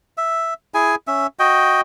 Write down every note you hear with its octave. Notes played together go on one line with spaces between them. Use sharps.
E5
E4 G#4 G#5
C#4 E5
F#4 D#5 G5